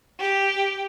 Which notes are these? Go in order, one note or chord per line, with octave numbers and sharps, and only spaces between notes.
G4